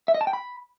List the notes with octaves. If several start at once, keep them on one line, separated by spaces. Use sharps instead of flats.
E5
D#5
A5
G5
B5